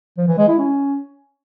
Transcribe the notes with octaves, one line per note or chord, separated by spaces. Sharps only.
F3
E3
G#3
E4
C#4